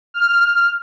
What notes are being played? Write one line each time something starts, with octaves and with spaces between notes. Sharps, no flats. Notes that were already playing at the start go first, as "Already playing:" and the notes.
F6